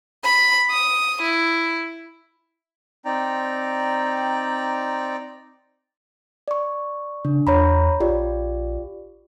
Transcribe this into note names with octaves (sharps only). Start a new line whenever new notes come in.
B5
D#6
E4
C4 D#4 D5 G5 A#5
D5 C#6
C#3 D4
E2 C#5 A#5 B5
A#1 F4 G4 D5